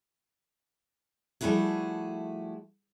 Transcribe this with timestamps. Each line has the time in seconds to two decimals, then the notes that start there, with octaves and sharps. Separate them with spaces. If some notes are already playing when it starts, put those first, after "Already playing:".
1.41 F3 G3 A3 E4 F#4 G#4